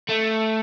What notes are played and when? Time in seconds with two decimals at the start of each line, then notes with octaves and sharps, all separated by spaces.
0.09 A3